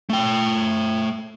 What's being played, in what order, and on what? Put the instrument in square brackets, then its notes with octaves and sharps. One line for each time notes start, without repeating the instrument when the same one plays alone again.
[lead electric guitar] A3 G5